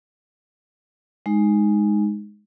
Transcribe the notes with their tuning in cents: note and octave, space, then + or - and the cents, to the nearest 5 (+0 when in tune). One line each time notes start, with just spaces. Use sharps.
G#3 +0 D#4 +0